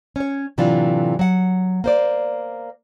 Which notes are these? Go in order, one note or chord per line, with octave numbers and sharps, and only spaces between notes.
C#4 C#5
A2 C3 E3 F#3 D4 F4
F#3 F#5
A#3 C5 D5